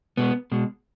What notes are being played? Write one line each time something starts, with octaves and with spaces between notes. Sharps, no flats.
B2 G#3 B3
B2 G#3